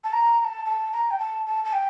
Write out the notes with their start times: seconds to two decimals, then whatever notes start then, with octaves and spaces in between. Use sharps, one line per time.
0.04 A5
0.13 A#5
0.40 A#5
0.45 A5
0.66 A5
0.93 A#5
1.11 G5
1.19 A5
1.47 A5
1.65 A5
1.73 G5